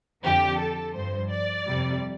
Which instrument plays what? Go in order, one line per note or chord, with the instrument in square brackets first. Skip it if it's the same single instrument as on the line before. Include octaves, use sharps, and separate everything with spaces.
[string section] F2 D3 F3 G4
A4
G2 F3 C5
D5
F2 C3 G3